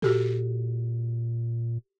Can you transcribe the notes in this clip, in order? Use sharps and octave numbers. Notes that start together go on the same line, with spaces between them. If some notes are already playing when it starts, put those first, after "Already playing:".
A#2 F#4 G4 A4